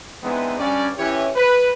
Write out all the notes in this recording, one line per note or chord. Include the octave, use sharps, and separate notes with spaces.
E3 G#3 B3 C4 D4 D#4
G2 C#4 D5
E3 C#4 E4 G4 C#5
B4